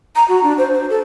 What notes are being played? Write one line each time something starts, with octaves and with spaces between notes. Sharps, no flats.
A#5
F#4
D4
C5
C5
A4